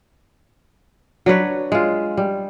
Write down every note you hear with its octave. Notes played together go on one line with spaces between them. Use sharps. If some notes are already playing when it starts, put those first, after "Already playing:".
F#3 D4 B4 C#5
G#3 F4
G3